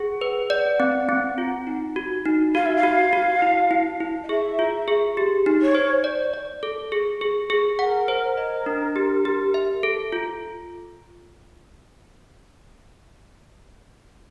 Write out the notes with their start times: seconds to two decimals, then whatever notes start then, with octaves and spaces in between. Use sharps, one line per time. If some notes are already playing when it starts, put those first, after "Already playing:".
Already playing: G#4 F#5
0.21 B4
0.50 D5
0.80 C4
1.09 C4
1.38 F4
1.67 D#4
1.96 F#4
2.25 D#4
2.55 F#4 F5
2.65 E5
2.76 F5
2.83 F#4
3.13 F#4
3.42 E4
3.71 E4
4.00 E4
4.23 D#5
4.29 G#4 E5
4.59 F4
4.88 G#4
5.17 G4
5.46 D#4
5.61 C#5
5.75 C5
6.04 D5
6.33 D5
6.63 A4
6.92 G#4
7.21 G#4
7.50 G#4
7.79 A#4 F#5
8.08 C5
8.37 D#5
8.66 D4
8.96 G4
9.25 G4
9.54 E5
9.83 A4
10.12 F4